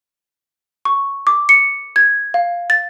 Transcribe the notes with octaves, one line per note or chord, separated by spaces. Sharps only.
C#6
D6
C#7
G#6
F5
A6